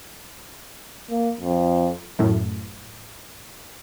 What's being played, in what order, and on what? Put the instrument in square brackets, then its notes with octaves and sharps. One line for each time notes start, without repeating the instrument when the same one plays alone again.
[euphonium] A#3
F2
[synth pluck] F#2 A2